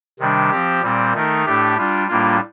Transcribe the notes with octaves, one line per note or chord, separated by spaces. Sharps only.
C3 D#3 G3 D4
F3 C4 G4
A#2 G3 C4
D#3 A3 D#4 A#4
A2 A3 D4 G4
G3 D4 F4
A2 G3 A#3 D4 F4